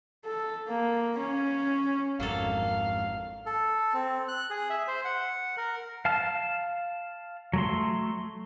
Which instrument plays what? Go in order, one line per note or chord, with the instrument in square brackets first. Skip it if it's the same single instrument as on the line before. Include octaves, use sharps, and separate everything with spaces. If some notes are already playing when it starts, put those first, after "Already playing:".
[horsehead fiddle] A4
A#3
C#4
[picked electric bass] G#1 F2 G#2 [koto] F#3 A#3 A4 [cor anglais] F5
[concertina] A4
C4
F#6
G#4
E5
C5
F#5
A#4
[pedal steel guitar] F5 A5 F6
F#3 A3 C6